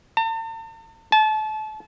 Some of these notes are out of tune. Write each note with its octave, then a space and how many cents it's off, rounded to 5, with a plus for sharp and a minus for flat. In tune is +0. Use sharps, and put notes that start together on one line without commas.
A5 +45
A5 -30